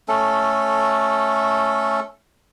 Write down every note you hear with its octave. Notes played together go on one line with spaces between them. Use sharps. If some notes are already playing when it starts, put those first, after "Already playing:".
A3 C#4 A4